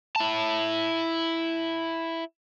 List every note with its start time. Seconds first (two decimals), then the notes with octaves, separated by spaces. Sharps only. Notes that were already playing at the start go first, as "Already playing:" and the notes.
0.16 E4 A5